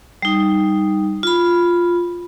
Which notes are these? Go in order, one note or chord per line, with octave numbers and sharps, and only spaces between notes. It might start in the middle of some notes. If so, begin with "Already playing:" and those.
G3 D#4
F4 B5